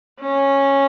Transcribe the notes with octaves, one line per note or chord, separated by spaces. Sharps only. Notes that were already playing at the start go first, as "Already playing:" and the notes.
C#4